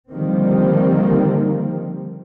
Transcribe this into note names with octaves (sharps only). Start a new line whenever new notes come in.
D3 D#3 F3 G3 A#3 C4